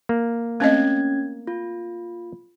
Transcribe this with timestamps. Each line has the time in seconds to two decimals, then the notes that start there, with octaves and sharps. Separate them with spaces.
0.09 A#3
0.60 A3 C4 C#4 D#5 G#6
1.47 F4